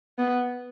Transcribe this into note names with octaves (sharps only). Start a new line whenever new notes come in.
B3